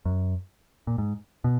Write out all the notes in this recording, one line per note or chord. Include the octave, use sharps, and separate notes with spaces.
F#2
A#2
G#2
B2